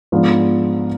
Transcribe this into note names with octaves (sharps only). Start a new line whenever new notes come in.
G#2 F3 B3 D4 F4